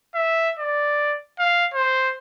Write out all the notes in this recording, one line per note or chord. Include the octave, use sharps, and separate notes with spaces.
E5
D5
F5
C5